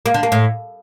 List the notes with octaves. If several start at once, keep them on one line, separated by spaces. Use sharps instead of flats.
A#3
D3
A#3
A2